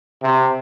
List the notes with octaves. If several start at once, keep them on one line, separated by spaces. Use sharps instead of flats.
C3